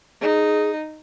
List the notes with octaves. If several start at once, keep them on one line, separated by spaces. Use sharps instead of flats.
D#4 G#4